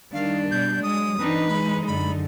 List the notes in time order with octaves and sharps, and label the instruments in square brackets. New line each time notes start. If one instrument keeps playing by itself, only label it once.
[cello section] D#3 [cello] G3 D4 [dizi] F5
[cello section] B2 [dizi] G6
[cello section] F#3 [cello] G#3 [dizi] D#6
[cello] E3 B4 [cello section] C4 D4 D#4
[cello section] G#3 D#4 [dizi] B5
[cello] F#2 D3 [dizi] B5